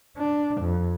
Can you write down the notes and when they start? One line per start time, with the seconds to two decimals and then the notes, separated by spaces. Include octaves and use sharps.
0.17 D4
0.61 F2